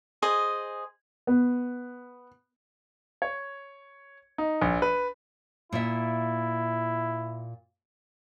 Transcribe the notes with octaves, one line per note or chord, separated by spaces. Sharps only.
G#4 C5 D#5
B3
C#5
D#4
A#1
B4
A#2 E4 E5